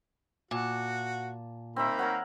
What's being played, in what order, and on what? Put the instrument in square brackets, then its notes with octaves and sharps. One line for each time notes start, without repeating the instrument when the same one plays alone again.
[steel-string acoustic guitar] A#2 A5 [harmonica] F#4
[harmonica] D#3 A#3 B5 [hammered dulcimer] C4 E5
[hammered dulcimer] A#4 C#5 F#5